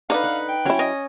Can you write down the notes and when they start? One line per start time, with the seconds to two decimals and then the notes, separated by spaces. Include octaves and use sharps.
0.10 D3 D#4 B4 D5 F5
0.24 F#5
0.48 G5
0.65 F#3 C#4 E4 C#5
0.79 D#5